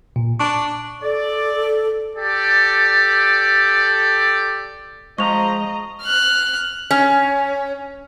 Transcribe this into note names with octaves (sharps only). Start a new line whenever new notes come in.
A#2
D4 C#6
A4 D5
G4 A4 D5
F3 G#3 D#5 A#5 C#6 F7
F6 F#6
C#4